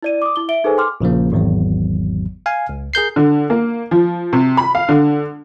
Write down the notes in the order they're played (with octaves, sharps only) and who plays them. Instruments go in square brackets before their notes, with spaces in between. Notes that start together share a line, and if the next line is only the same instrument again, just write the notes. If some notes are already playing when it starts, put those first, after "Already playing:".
[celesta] E4 D5 D#7
D6 D#6
E4 G7
E5 D7 G7
D#4 G#4 A4 B4 C5 G#5
G5 C6 D6 F6
[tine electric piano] A#1 C#3 F3 A#3
G#1 E2 F#3
F5 G#5
C#2
G#4 A#4 G6 C7
[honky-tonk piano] D3
A#3
F3
C3
B5
F5
D3